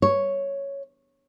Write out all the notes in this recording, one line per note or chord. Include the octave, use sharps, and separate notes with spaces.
C#5